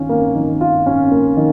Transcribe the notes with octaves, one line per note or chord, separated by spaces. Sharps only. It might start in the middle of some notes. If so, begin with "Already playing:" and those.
Already playing: D#3 C#4 F4
A#3
D#3
F4
C#4
A#3
D#3